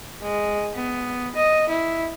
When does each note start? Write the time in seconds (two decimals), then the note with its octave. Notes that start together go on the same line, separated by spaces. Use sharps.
0.22 G#3
0.75 B3
1.36 D#5
1.70 E4